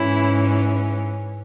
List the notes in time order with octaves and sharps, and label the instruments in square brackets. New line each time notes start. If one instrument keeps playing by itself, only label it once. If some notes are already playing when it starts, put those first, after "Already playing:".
Already playing: [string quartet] G#2 E3 C#4 E4